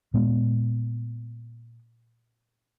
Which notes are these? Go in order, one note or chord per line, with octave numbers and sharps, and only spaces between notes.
A#2 G#3 B3